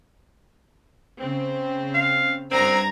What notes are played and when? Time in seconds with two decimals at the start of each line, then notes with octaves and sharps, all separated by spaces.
1.19 C#3 C4
1.94 F5
2.51 G2 C4 A#5 G#6